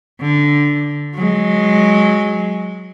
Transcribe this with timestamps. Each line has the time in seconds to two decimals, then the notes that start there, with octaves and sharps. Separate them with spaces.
0.21 D3
1.15 F#3 G#3